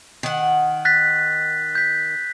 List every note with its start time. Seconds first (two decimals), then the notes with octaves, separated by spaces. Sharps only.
0.23 D#3 F#5
0.85 F#6 A6 B6
1.75 G6 B6